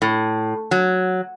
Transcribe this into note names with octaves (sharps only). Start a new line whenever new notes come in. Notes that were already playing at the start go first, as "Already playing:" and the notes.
A2
F#3